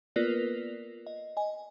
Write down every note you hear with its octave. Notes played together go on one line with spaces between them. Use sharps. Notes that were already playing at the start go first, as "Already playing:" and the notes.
A#3 B3 F4 A#4 B4 D5
D#5
D#5 G#5